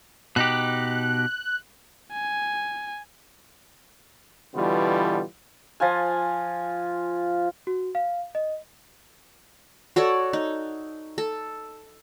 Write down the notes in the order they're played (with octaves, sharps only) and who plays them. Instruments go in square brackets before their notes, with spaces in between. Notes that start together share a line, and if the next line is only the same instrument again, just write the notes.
[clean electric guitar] B2 D#4 G4 [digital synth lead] F#6
[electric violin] G#5
[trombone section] B2 D3 E3 G3 B3 F4
[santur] F3 F4 G#5
[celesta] F#4
F5
D#5
[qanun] F#4 A4 C#5 D5
D#4
A4